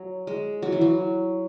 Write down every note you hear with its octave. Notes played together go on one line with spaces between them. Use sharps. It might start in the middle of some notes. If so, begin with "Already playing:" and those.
Already playing: F#3
G#3
F#3
E3
F#3